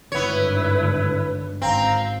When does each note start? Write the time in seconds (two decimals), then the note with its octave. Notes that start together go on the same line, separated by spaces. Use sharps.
0.12 G#1 G2 D3 B3 E4 B4 C#5
1.62 G#1 C4 F5 A#5